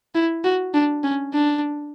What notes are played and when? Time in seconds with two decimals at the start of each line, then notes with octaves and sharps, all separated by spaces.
0.15 E4
0.44 F#4
0.74 D4
1.04 C#4
1.33 D4